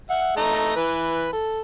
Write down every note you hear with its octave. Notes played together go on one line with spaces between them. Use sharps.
E5 F#5
A3 D#5 A#5
E3 B4
A4